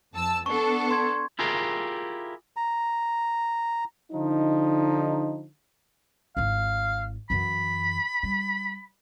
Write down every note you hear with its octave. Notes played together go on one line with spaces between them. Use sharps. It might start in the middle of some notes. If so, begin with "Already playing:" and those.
F2 A5 E6
B3 D4 A4 C#6
C6 G#6
E4 F4 G4 G#4 A#4
A#5
D3 F3 D#4
G#1 E4 F5
F#2 E3 B5
G3